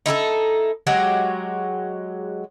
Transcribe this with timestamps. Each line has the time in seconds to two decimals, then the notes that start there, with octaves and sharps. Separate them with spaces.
0.06 D#4 E4 G#4 A4
0.87 F#3 G#3 F#4 G4